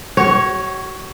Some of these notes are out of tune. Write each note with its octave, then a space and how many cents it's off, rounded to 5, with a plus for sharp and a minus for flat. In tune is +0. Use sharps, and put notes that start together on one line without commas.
F#4 +35 C#5 +0